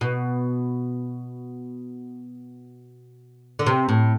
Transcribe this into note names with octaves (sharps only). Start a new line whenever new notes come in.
B2
D3
C3
A2